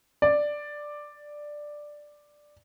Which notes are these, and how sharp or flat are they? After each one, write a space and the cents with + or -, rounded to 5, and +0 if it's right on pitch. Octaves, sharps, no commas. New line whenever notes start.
D5 +5